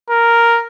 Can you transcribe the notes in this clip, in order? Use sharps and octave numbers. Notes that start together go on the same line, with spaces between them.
A#4